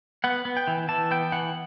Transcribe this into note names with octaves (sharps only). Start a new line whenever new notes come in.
B3 F#5
B3
G5
E3
E3 A5
B3 G5
E3 F#5